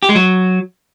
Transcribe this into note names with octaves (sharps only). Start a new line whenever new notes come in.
G4
G#3
F#3